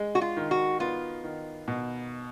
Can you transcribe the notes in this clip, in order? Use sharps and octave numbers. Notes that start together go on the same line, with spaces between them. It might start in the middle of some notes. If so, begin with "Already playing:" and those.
Already playing: G#3
F#4
F4
D#3
F#4
B3 F4
D#3
B2